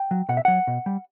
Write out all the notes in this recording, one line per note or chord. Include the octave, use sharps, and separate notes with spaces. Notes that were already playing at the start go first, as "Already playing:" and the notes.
Already playing: G5
F#3
B2 F#5
E5
F#3 F#5
B2
G3